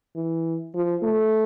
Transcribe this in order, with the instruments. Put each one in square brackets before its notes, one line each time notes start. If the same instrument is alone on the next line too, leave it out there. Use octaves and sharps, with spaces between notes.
[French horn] E3
F3
A3